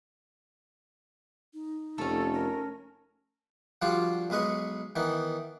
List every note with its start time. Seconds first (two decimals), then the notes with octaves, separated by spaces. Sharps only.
1.54 D#4
1.98 F1 A3 C#4 A4
2.34 A#4
3.82 D3 F3 G3 F4 F#4
4.30 B1 G#3 B4 D#5 C#6
4.96 D#3 E3 B3 D#4